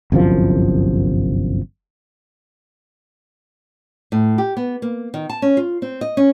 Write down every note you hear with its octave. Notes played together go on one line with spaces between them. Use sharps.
G1 C2 F#2 F3
A2
G4
B3
A#3
D#3
A5
C#4
F4
C4
D#5
C#4